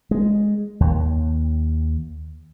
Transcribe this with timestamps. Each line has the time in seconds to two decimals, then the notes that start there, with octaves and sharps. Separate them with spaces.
0.11 G#3
0.80 D#2